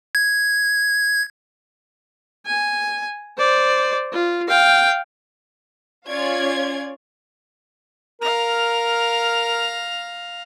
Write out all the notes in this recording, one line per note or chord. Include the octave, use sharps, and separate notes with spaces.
G#6
G#5
C5 D5
F4
F5 G5
C#4 F4 C#5 D5 F5 G#6
A#4 F5 A#5